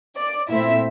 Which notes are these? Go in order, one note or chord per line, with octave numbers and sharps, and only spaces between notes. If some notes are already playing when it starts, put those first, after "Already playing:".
D5
A#2 A3 C4 E4 E5